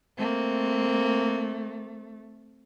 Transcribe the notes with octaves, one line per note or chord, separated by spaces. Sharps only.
A3 A#3 C4